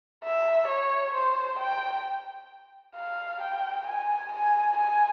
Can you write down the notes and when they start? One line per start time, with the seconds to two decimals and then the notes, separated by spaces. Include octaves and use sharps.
0.24 E5
0.68 C#5
1.14 C5
1.59 G5
2.95 F5
3.41 G5
3.86 G#5
4.32 G#5
4.77 G#5